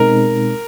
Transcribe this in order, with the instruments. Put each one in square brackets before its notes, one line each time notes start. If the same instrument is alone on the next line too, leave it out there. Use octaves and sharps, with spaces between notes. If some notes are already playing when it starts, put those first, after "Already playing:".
Already playing: [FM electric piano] B2 G#3 C4 D#4 [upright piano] A#4